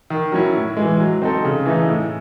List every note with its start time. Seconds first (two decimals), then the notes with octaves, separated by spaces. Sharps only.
0.10 D#3
0.32 F#3 C#4 E4
0.55 A2
0.77 E3 G#3
1.00 F#3
1.22 C4 D#4 A4
1.45 C#3
1.66 E3 A3 D#4
1.89 A2